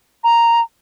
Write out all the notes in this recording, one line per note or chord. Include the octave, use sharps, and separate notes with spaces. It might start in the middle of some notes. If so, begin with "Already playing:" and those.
A#5